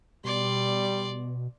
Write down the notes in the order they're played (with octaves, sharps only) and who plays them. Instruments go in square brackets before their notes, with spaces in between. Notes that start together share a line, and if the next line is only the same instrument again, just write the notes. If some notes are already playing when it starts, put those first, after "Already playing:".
[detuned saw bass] B2 [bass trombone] G3 [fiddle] D5 C6